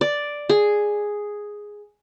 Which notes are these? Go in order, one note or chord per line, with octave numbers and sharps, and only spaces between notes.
D5
G#4